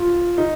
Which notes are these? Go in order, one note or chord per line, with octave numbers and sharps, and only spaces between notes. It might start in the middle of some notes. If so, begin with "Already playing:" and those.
Already playing: F4
D#4